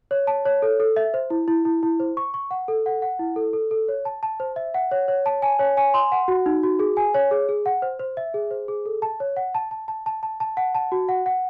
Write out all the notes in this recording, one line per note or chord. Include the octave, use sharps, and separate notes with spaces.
C#5
A5
C#5
A4
A4
E5
C5
E4
E4
E4
E4
C5
C#6
C#6
F#5
A4
F#5
F#5
E4
A4
A4
A4
C#5
A5
A5
C5
E5
F#5
C#5
C#5
A5
G#5
C#5
G#5
C6
F#5
F#4
D#4
F#4
G#4
G#5
C#5
G#4
G#4
F#5
C5
C5
E5
G#4
C5
G#4
A4
A5
C#5
F#5
A5
A5
A5
A5
A5
A5
F#5
A5
F#4
F#5
F#5